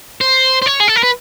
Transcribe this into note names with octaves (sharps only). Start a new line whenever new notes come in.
C5
C5
C#5
G#4
A4
A#4
B4